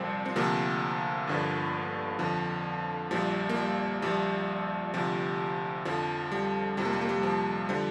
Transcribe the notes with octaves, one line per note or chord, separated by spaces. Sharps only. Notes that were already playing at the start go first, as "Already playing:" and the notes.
Already playing: C2 A#2 F3 G3 C4
C4
D2 C3 F3 A#3
G1 G2 D3 F3
F2 D3 F3
A#1 A#2 F3 G3
A#3
G3
A#1 A#2 F3 G3
D2 C3 F3
F2 D3 F3
G3
F2 C3 F3 G3
A#3
G3
A#3
G3
F3
D3 F3 G3